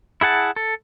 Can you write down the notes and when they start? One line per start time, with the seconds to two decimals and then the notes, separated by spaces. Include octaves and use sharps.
0.21 E4 G#4 F#5 A5
0.56 A4